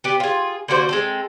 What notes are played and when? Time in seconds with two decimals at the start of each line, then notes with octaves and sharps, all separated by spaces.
0.04 B3 G4
0.20 F4 G#4
0.68 D3 A#3 F#4 C5
0.89 G#3 C4 A4